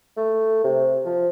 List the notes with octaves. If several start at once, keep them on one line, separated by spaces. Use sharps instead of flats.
A3
C3
F3